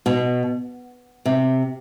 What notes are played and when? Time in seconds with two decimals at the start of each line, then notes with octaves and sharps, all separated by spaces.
0.06 B2
1.26 C3